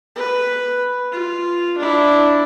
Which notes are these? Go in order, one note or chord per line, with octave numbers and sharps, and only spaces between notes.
B4
F4
D4 E4